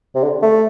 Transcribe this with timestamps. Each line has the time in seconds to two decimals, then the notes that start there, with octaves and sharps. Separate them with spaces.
0.15 C3
0.23 D3
0.42 A3